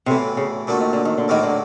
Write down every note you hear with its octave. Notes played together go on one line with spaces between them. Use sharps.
B1 A2 C3 E3
C#3
A#2 D3 F#3 A3
D#3
D3
D#3
D3
A#1 A2 D#3 F#3 A#3
D3